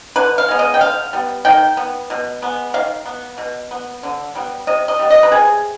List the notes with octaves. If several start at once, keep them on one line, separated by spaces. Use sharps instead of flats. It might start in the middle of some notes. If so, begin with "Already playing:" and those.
D3 B4
F5
G#3 B3
D#5
G5
D3 F5
G3 B3
D#3 G5
B3
B2
G#3 B3
D#3 F5
B3
B2
B3
D3
G3 B3
C3 D#5
D#5
G3 B3
D#5
B4
C3 G#4